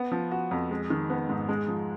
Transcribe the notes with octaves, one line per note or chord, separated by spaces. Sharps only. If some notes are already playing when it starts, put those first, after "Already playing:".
Already playing: B3
F3
F#4
F2
G#3
D#3
B3
G#2
G#3
F3